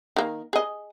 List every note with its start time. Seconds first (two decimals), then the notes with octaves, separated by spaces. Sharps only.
0.16 D#3 A#3
0.53 G#4 D#5